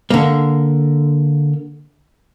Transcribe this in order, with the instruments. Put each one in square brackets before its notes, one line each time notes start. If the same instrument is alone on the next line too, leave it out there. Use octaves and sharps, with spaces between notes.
[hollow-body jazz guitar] D3 A#3